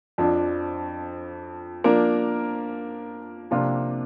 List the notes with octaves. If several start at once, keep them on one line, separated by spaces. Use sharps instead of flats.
F2 F3 D4
F3 A#3 D4 A#4
C3 F3 A#3 D4 F4